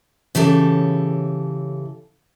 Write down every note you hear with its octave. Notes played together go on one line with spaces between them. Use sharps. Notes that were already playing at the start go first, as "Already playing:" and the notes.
C#3 E3 G4 A4 C#5